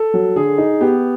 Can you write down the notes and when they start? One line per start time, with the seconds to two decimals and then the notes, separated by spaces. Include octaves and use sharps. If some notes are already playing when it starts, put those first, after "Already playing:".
Already playing: A4
0.14 F#3
0.36 D3 G#4
0.58 D#4
0.81 B3 G4